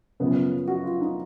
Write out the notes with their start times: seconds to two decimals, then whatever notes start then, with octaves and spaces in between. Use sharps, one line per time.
0.20 F#2 C#3 F3 B3
0.68 F#4
0.84 F4
1.01 D#4